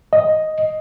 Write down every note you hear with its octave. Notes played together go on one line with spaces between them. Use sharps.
D#5